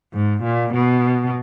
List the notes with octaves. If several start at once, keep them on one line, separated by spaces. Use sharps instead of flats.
G#2
A#2
B2